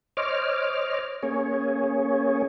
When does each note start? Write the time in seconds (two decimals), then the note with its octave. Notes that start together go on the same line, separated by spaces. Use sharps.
0.17 C5 C#5 D#5 D6 F6
1.23 A#3 C#4 G#4 C#5